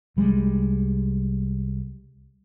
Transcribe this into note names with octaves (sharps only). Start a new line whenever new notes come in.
C2 G3 G#3